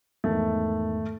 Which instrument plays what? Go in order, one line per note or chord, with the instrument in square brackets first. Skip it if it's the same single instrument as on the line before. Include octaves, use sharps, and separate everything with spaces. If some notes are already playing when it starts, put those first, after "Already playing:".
[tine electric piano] E2 G#2 D#3 [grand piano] A3